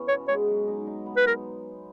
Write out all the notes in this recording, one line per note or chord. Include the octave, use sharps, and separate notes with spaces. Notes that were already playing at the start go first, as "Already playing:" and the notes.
Already playing: E3 B3 C#4
B2 C#5
G#3 C#5
F#3
D#4
D#4
B3
B4
B3 A#4